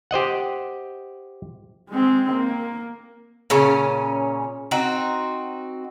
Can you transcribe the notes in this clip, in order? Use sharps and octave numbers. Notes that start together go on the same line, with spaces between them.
G4 C5 D#5 F#5
G#3 C4
A#3
A#2 C#3 C#4
C4 D#4 F#4